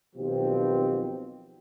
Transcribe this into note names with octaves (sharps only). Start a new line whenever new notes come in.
B1 B2 D#3 F3 C4 G4